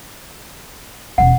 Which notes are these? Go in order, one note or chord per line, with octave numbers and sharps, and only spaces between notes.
E1 C#4 F#5